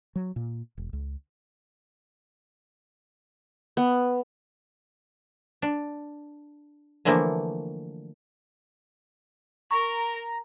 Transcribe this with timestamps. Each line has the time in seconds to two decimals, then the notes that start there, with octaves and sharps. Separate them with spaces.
0.16 F#3
0.36 A#2
0.77 E1
0.93 C#2
3.77 B3
5.62 D4
7.05 D3 E3 F3 A3 A#3
9.71 A#4 A#5 C#6